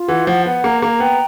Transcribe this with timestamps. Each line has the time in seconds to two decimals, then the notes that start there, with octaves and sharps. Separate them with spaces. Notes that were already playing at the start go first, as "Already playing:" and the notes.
Already playing: F4
0.08 E3 F#5
0.27 F3 F#5
0.46 B3 F#5
0.64 A#3 A#5
0.82 A#3 A#5
1.00 B3 G5